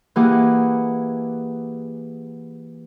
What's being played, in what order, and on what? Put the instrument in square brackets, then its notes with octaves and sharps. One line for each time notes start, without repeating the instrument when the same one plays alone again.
[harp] E3 A#3 G4 G#4 F#5 D6